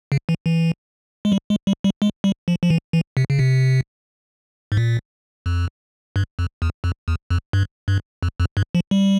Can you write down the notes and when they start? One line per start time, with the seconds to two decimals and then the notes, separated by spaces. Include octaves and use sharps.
0.12 C#3
0.29 E3
0.46 E3
1.25 G#3
1.32 G3
1.50 G#3
1.67 G3
1.84 G3
2.02 G#3
2.24 G3
2.48 F3
2.63 F3
2.70 E3
2.93 E3
3.17 C3
3.30 C#3
3.39 C3
4.72 G#2
4.77 A#2
5.46 F2
6.16 G2
6.39 F2
6.62 E2
6.84 F2
7.08 E2
7.30 F2
7.53 G2
7.88 G2
8.23 F2
8.40 F2
8.57 G2
8.75 F3
8.91 G3